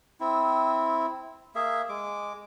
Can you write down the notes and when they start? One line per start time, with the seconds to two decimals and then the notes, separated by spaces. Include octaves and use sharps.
0.20 C4 E4
1.55 A#3 G#4 E5
1.89 G#3 D6